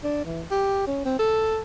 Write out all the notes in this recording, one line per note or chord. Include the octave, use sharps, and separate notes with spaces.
D4
E3
G4
C#4
C4
A4